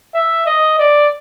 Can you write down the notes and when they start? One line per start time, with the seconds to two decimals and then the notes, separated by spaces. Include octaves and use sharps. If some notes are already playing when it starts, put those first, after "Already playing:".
0.14 E5
0.46 D#5
0.79 D5